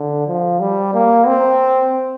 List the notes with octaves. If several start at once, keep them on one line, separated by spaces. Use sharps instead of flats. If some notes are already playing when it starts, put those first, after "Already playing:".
Already playing: D3
F3
G3
A#3
C4